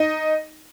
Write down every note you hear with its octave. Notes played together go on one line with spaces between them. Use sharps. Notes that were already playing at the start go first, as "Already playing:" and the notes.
Already playing: D#4